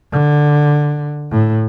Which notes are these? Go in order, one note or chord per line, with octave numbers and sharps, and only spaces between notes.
D3
A2